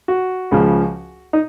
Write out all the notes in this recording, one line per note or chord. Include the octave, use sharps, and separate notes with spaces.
F#4
C#2 C#3 F3
D#4